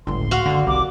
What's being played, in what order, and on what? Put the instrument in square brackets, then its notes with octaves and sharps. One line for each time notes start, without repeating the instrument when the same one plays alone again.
[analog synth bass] G1 [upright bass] C#2 A2 [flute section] C6
[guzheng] F#4 F5
[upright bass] F#1 D#3 [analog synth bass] D3
[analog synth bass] C2 [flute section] D6